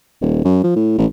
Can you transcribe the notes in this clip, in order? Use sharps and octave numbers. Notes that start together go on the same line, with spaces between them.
D#1
F#2
F3
A2
A1